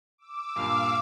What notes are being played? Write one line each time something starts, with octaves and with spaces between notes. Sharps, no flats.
D6 E6
G2 A#2 F5